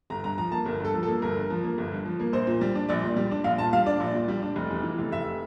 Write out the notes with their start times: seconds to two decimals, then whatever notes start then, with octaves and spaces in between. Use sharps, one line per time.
0.10 G1 A#5
0.24 G2 A#5
0.38 F3 A#5
0.52 A#3 A5
0.66 G1 A#4
0.80 G2 A4
0.94 F3
1.03 A4
1.07 A#3
1.22 G1 A#4
1.36 G2
1.50 F3
1.63 A#3
1.78 G1
1.92 G2
2.05 F3
2.20 A#3
2.33 A#1 C5
2.47 A#2
2.61 G3
2.75 D4
2.89 A#1 D5
3.03 A#2
3.16 G3
3.31 D4
3.44 A#1 F5
3.58 A#2 A5
3.73 G3 F5
3.86 D4 D5
4.00 A#1
4.14 A#2
4.28 G3
4.42 D4
4.56 F1
4.70 E2
4.83 E3
4.98 F1
5.12 F1 E5